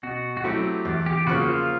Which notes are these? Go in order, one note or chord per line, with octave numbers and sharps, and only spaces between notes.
B2 F#4
F#4
F#3 A3 C4 E4 G4
E2
G4
C#3 F3 A#3 F#4
F4